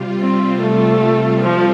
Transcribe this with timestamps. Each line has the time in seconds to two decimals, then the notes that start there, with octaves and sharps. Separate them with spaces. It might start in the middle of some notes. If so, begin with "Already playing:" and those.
Already playing: C3 G3 F4
0.21 C4
0.62 A3
1.41 F3 G3 C4 F4 A4